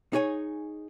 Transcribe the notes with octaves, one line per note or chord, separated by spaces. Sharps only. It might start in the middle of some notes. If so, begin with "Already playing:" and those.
D#4 G#4 C#5 G#5